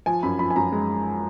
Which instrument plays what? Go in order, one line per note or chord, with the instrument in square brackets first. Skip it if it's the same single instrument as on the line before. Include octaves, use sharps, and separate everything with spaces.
[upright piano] F3 G#5
F#2 B5
F3 B5
G#5
F#2 A#5
G#3